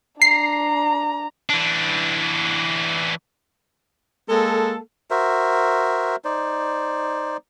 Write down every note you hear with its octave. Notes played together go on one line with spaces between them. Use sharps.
D4 A#5 C7
E3 D4
G#3 A#3 A4
F#4 A#4 C5 E5
D#4 C5 D5